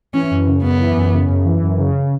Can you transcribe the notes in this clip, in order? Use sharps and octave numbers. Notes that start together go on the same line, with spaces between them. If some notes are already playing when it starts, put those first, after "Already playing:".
E3 C#4
F#2
C#3
F#2 B3
E3
F#2
C#3
F#2
E3
F#2
C#3